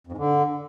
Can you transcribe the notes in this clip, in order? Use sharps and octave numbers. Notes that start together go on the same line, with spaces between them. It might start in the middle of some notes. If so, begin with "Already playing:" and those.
F2
G#2
D3